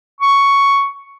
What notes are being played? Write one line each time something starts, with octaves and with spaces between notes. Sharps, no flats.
C#6